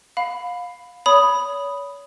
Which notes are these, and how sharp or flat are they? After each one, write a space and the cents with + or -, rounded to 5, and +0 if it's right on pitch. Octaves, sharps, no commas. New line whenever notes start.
F5 +25 B5 +10
C#5 +35 B5 +0 D#6 +0